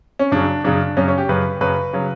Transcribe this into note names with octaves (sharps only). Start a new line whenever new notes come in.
C#4
F#2 C#3 F#3 D4
F#2 C#3 F#3 D4
F#2 C#3 F#3 C#4
C#4
G4
F#2 C#3 F#3 B4
F#2 C#3 F#3 B4
C#3 F#3